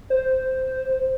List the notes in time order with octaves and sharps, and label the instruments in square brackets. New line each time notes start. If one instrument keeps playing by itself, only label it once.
[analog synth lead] C5